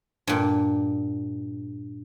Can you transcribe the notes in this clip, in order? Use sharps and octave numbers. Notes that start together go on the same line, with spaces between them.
G2 A#2